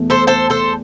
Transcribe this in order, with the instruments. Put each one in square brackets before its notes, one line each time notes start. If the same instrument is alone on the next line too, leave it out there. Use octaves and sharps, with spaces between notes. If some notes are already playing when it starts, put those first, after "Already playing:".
Already playing: [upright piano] E2 B2 A3
[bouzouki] A4 C5
A4 C5
A4 C5